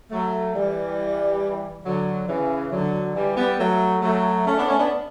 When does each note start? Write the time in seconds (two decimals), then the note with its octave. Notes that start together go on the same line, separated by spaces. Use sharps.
0.12 F#3 A3
0.55 E3 G3
1.85 D3 F#3
2.28 C#3 E3
2.72 D3 F#3
3.15 E3 G3
3.37 G3 B3
3.59 F#3 A3
4.02 F#3 A3
4.47 A3 C#4
4.58 B3 D4
4.68 A3 C#4
4.79 B3 D4